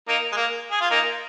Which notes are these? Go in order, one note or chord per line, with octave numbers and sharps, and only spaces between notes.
A#3 D#4
G#3
A#3
G#4
F4
A#3 D#4